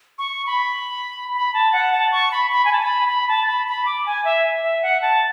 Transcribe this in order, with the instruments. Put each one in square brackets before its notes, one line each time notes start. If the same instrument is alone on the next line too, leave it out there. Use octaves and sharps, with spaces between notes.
[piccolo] C#6
B5
B5
A5
F#5
A5
C#6
B5
B5
G#5
A5
B5
B5
A5
B5
B5
D6
G#5
E5
E5
F#5
A5